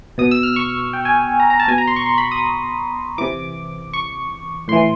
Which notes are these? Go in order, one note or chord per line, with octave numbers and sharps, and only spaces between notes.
B2 D#6
E6
F6
C#6
G5
G#5
A#5
A#5
A5
B2 G#5
A#5
C6
C#6
C6
B5
D#6
C3 E3 D6
C#6
A2 E3 C6